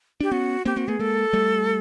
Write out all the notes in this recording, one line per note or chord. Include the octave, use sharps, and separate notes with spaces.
D4 G4
B3 C#4 F#4
A#3 C4 G4
A#3 C4 F#4
A3 B3 G#4
G#3 A#3 A4
G3 A3